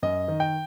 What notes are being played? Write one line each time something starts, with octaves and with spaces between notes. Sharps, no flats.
F#2 D#5
D#3
G5